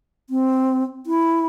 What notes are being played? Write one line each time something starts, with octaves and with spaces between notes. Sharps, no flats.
C4
E4